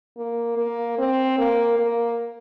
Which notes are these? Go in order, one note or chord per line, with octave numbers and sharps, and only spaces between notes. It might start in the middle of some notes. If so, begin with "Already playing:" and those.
A#3
A#3
C4
A#3
A#3